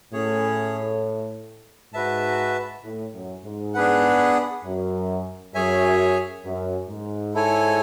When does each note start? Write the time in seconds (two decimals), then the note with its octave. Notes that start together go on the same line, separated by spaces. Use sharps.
0.13 A2 C#4 G#4 C#5
1.94 G#2 F#4 B4 E5 A5
2.84 A2
3.14 F#2
3.44 G#2
3.74 B3 D4 G#4 B4 F#5
4.64 F#2
5.54 F#2 G#4 C#5 E5 G#5
6.45 F#2
6.90 G#2
7.34 E4 A4 C#5 G#5